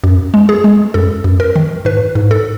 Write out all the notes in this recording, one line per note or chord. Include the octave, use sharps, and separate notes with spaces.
F#2
G#3
G#4
G#3
F#2 A4
F#2
A#4
D#3
G#2 B4
G#2
A4